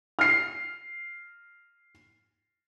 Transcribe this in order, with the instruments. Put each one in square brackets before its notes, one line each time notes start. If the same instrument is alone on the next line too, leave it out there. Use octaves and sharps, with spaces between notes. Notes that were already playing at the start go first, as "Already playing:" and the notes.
[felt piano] F6 C7